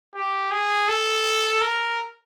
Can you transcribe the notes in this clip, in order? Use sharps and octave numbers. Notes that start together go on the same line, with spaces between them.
G4
G#4
A4
A#4